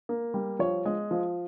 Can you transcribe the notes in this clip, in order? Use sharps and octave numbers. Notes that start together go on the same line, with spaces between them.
A#3
G3
F3 C#5
G#3
F3